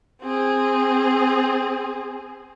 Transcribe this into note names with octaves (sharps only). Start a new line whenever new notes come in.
C4 G#4